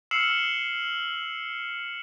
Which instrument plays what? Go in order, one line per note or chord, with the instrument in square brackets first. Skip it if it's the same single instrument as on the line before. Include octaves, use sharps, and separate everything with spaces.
[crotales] E6 F6 C7 C#7 E7 F#7